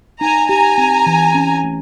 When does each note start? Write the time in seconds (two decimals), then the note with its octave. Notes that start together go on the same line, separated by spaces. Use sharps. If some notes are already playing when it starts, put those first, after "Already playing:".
0.20 D#4 G#5 A#5
0.49 G4 G#5 A#5
0.78 C4
1.06 E3
1.35 C#4
1.64 A3